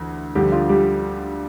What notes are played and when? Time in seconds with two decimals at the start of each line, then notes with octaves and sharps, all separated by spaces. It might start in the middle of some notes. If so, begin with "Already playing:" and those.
Already playing: D2 E3
0.35 D2 D3 F3 G3 G4
0.52 F3 F4
0.69 G3 G4